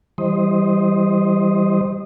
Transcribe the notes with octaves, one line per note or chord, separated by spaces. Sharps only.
E3 G3 C5 D#5